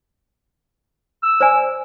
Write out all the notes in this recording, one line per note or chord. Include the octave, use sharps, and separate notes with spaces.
E6
C5 D5 G#5